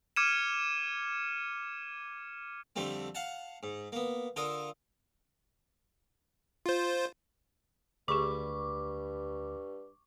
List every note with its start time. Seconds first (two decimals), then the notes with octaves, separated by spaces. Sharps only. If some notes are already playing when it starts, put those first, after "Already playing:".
0.16 D6 F6 G#6 C#7 D#7 E7
2.76 F2 D3 G3 A3 C4
3.15 F5 F#5 A5
3.63 G#2
3.92 A#3 B3
4.36 D3 F4 A4 A#4 D#6
6.66 F4 C5
8.08 D2 G2 G4 G#4 B5 C#6 D6